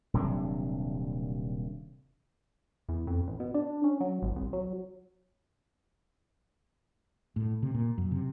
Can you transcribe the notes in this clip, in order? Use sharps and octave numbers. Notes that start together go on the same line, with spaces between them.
D#1 C3 F#3 D4
E2
F2
A1
B2
D4
C#4
F#3
G#1
C2
F#3
A2
C3
A#2
F#2
C3